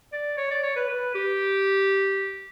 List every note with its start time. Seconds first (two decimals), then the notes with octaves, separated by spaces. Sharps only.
0.13 D5
0.38 C#5
0.51 D5
0.63 C#5
0.76 B4
0.89 B4
1.15 G4